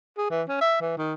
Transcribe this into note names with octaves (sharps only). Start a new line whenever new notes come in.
G#4
E3
C#4
E5
E3
D#3